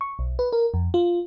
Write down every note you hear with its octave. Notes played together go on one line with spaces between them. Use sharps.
C#6
B1
B4
A#4
F2
F4